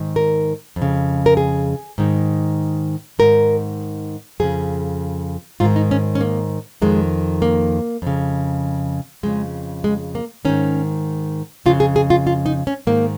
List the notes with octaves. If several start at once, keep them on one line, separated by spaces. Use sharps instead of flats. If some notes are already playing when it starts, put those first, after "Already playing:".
Already playing: G#2 D#3
A#4
F2
C#3
A#4
G#4
G#2 D#3
G#2 D#3 A#4
F2 C#3 G#4
G#2 D#3 F4
D#4
C#4
C#4
A#3
F2 D#3 G#3
A#3
F2 C#3
F2 C#3 G#3
G#3
A#3
G#2 D#3 C#4
F2 C#3 F4
G#4
G#4
F4
F4
D#4
C#4
G#2 D#3 A#3